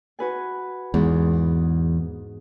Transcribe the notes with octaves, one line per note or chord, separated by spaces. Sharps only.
F#4 B4 G#5
E2 G#2